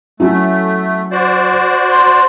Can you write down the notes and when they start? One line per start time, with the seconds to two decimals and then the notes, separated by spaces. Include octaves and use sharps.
0.20 F#3 A3 C#4 E4
1.11 F#4 C5 D5
1.90 C6